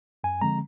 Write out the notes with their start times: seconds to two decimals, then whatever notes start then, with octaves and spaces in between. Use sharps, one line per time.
0.24 F#2 G#5
0.41 D3 F3 G#3 C4 A#5